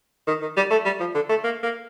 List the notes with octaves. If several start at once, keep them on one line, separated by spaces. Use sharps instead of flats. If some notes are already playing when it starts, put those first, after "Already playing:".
D#3
D#3
G3
A3
G3
F3
D3
A3
A#3
A#3